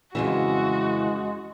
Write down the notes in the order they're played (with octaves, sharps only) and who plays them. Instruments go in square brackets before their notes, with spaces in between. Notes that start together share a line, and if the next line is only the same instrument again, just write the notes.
[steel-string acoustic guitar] F2 C#3 E3 [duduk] G#3 [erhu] F#4